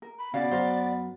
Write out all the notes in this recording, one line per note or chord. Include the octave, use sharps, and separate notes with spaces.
A#4
B5
C#3 B3 C#4 F#4 D5 F5
F#2 A#4 C5